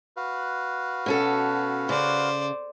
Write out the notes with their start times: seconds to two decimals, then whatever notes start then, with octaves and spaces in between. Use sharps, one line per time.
0.17 F#4 B4 F5
1.06 B2 C#4 A4
1.89 C#3 C5 D5